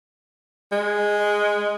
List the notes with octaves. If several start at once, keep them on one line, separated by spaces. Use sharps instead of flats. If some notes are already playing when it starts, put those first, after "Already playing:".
G#3